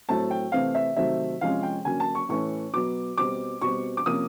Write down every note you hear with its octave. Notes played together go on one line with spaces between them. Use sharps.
A2 F#3 A3 C4 A5
G5
C3 E3 A3 C4 F5
E5
C3 D#3 F#3 A3 C4 E5
C3 F3 G#3 C#4 F5
G5
D3 F#3 A#3 C#4 G#5
A5
C#6
A2 E3 A3 C#4 C#6
B2 F#3 B3 D6
B2 G3 C4 D6
B2 G3 C4 C#6
D6
C3 F3 A#3 C#4 D#6